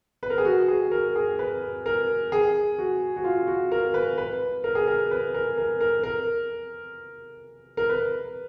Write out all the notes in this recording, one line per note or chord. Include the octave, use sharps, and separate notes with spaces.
B4
A#4
G#4
F#4
G#4
A#4
G#4
B4
A#4
G#4
F#4
F#4
F4
F#4
A#4
B4
B4
A#4
G#4
A#4
B4
A#4
A#4
A#4
A#4
A#4
B4